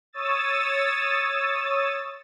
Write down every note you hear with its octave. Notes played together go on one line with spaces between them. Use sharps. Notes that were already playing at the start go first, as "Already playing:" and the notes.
C#5 D#6 E6 A6